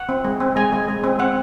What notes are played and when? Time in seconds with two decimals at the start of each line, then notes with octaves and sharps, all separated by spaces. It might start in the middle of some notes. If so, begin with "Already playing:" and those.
Already playing: F#5
0.09 C4
0.25 G#3
0.40 C4
0.56 G#3 G#5
0.72 G#3
0.88 G#3
1.04 C4
1.19 C4 F#5